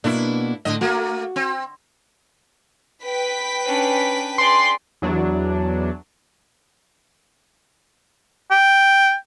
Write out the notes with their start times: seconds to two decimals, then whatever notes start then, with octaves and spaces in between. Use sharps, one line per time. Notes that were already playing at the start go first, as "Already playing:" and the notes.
0.04 B2 A#3 D4 E4 B4
0.65 A2 D3 D#5
0.81 A3 A#3 F#4
1.36 C4
3.04 B4 G5 B6
3.65 C#4 D4
4.38 G#4 D5 C6
5.02 E2 F#3 D4
8.51 G5